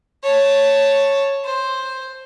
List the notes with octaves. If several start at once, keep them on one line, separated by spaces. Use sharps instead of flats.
C#5 A5
C5